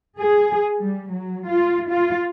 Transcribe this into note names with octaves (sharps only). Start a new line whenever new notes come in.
G#4
G3
F#3
F4
F4